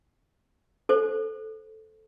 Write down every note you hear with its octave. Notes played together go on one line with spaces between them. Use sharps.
A4 C5